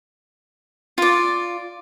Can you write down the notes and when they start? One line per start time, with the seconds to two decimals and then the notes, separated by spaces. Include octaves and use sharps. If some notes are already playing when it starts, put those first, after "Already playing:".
0.98 F4 D5